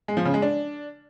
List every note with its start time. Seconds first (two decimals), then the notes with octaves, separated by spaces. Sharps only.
0.08 G#3
0.17 F3
0.25 C#3
0.34 G#3
0.42 D4